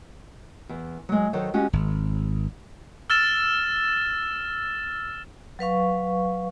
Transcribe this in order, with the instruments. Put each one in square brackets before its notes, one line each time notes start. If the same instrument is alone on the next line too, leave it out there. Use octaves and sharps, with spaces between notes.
[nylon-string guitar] E2
F#3 G#3
D#3 F#3 A4 C5 C#5
G#3 C#4 F#4 G4
[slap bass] G#1
[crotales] E6 F6 A6 E7
[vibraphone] F#3 B4 F5 C#6